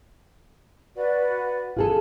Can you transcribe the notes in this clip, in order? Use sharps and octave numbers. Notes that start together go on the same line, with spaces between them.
F#4 B4 D5
F4 G#4 A4 G#5